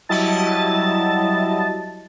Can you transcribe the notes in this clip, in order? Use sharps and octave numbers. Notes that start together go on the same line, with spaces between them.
F#3 G3 E4 D#5 A5 A6